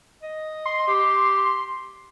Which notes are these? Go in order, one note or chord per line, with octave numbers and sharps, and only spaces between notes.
D#5
C6
G4